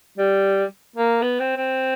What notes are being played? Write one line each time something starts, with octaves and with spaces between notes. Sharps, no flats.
G3
A#3
B3
C4
C4